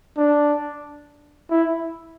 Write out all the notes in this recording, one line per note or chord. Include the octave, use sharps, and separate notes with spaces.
D4
E4